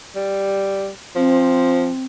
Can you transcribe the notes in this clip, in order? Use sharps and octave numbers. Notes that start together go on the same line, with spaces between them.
G3
F3 C4